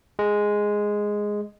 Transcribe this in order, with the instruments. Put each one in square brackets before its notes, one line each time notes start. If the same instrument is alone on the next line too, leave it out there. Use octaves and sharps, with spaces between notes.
[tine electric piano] G#3